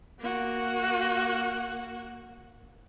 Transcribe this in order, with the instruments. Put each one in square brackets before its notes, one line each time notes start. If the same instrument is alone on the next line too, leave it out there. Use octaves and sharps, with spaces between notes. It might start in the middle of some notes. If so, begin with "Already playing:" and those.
[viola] A#3 F#4